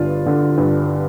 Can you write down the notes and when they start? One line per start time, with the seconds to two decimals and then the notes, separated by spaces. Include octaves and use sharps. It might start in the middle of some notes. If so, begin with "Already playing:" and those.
Already playing: G1 G2 D4 F4
0.26 D3
0.58 G2